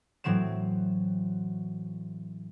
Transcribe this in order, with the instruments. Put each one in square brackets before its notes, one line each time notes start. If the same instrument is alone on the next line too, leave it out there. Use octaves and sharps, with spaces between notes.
[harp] A2 E3 F#3 C4 E7